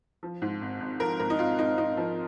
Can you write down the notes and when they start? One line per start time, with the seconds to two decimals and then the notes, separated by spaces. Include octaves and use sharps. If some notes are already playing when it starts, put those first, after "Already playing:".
0.23 F3
0.42 G#2
0.61 G#1
0.80 G#1
1.00 F3 A#4
1.20 G#1 A#4
1.30 D#4
1.39 G#1 F4
1.58 G#1 D#4
1.78 G#1 D#4
1.97 F3